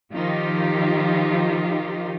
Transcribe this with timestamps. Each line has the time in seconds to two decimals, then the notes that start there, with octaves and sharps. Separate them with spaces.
0.12 D#3 F3 D#4 F4 G4